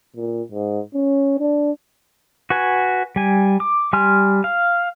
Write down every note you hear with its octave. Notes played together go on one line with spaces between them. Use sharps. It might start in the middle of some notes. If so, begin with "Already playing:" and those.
A#2
G#2
C#4
D4
F#4 B4 G#5
G3 G#5
D6
G3 G#5 C6 F6
F5